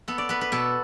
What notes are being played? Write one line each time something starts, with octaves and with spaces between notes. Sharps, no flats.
B3 A4
D5
B3 B4
B4
B2 A4